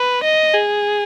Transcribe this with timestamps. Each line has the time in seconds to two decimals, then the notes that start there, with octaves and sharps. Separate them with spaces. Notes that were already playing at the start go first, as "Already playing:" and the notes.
Already playing: B4
0.24 D#5
0.54 G#4